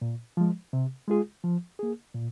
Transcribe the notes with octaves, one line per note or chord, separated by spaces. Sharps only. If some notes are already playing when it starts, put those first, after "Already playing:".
A#2
F3 G#3
C3
G#3 F4 G#4
F3
A#3 G#4
A#2